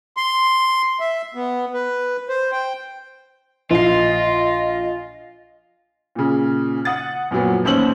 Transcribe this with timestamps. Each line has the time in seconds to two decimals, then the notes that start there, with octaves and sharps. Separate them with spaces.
0.17 C6
1.00 E5
1.35 B3
1.73 B4
2.29 C5
2.52 G5
3.71 A#1 F4 D#5 C7
6.15 A#2 C#3
6.85 F#5 D#6 A6
7.31 F#2 A#2 F3 F#3 B3
7.64 A1 D#2 C#4 C5 E6 F#7